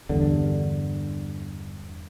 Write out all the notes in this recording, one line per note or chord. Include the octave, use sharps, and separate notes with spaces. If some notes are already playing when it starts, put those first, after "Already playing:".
E2 G2 D3